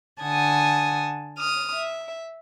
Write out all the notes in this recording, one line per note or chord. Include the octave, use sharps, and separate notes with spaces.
D3 F#5 G#5 A5 D#6
D#6 F6
E5